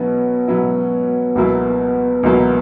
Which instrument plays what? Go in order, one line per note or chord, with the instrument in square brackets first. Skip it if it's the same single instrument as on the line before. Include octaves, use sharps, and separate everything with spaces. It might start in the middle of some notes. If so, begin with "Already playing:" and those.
Already playing: [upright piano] B2 F#3 C#4 E4 [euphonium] B3
[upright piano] B2 F#3 C#4 E4
C#2 B2 F#3 A#3 E4
C#2 B2 F#3 A#3 E4